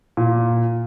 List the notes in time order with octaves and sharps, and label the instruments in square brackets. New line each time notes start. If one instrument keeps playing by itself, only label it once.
[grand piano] A#2